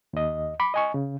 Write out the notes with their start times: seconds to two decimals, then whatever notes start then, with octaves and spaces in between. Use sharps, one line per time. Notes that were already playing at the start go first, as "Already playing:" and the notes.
0.13 D#2 D#5
0.60 B5 D6
0.74 D#5 G#5 C#6
0.94 C#3